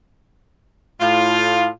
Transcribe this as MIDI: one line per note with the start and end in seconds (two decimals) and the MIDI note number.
1.01 1.68 45
1.01 1.68 65